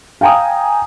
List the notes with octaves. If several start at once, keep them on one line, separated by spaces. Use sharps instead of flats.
F5 G5 G#5 A#5 D#6